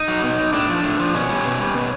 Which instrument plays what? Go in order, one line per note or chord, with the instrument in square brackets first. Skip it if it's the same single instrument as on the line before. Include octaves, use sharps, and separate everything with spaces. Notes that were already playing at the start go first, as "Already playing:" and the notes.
Already playing: [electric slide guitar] D#4
F#3
B2
F#3
A2 D4
F3
A2
F3
B2 C#4
G3
B2
G3
B2